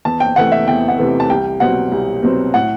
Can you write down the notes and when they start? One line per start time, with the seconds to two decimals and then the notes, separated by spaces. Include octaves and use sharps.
0.05 E2 A5
0.20 G5
0.36 C3 E3 A3 F#5
0.52 E5
0.67 E2 G5
0.88 F#5
0.98 C3 E3 A3
1.20 A5
1.30 C2 G5
1.60 B2 F#3 C4 F#5
1.92 C2
2.23 B2 F#3 C4
2.54 A2 F#5